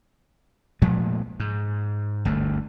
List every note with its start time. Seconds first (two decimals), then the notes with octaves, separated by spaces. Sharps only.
0.82 A#2 F3 G#3 A3
1.40 G#2
2.25 G1 D2 A3